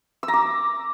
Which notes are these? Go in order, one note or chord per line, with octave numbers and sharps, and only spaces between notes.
E6
A#5
D6